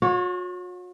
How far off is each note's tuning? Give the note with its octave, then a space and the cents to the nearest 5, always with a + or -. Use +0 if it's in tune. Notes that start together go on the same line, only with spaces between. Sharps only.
F#4 -45 C#5 +0